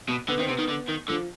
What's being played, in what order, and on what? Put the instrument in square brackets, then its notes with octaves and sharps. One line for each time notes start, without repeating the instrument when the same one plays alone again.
[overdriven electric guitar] B2
[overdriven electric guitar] D3 [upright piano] B3
[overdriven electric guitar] D#3 [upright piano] C4
[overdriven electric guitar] C3 [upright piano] B3
[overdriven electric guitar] D#3
D3
D#3
[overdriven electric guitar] D3 [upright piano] F3